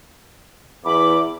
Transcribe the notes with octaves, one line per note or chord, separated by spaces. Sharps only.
E2 B5 D6